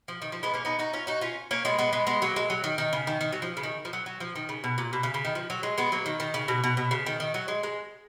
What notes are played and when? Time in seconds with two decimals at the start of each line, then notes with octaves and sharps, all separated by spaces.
0.08 F3
0.22 D#3
0.32 F3
0.43 G#3 B3
0.54 A#3 C#4
0.65 B3 D#4
0.79 D#4 F#4
0.93 C#4 F4
1.07 D#4 F#4
1.21 C#4 F4
1.51 A#3 C#4
1.65 G#3 B3
1.78 G#3 B3
1.93 G#3 B3
2.07 G#3 B3
2.22 F#3 A#3
2.36 G#3
2.50 F#3
2.64 D#3
2.78 D#3
2.93 C#3
3.07 D#3
3.21 D#3
3.32 F#3
3.42 F3
3.57 C#3
3.63 D#3
3.85 F3
3.93 F#3
4.06 F#3
4.20 F3
4.36 D#3
4.49 C#3
4.64 B2
4.78 A#2
4.93 B2
5.03 C#3
5.14 C#3
5.25 D#3
5.35 F3
5.50 F#3
5.63 G#3
5.78 G#3 B3
5.92 F#3 A#3
6.06 D#3
6.20 D#3
6.34 C#3
6.48 B2
6.64 B2
6.77 B2
6.91 C#3
7.06 D#3
7.20 D#3
7.34 F#3
7.48 G#3
7.63 G#3